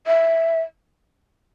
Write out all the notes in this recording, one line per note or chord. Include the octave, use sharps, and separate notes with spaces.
E5